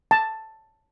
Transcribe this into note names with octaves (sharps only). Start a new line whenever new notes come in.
A5